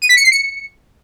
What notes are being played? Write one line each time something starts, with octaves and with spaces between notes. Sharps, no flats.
D#7
B6
C#7
C7
C#7